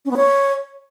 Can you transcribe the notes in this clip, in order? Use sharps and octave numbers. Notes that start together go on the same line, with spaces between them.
C#4
B3
C#5